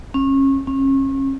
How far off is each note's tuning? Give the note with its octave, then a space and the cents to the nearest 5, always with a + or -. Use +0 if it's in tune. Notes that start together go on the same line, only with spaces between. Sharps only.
C#4 -30
C#4 -35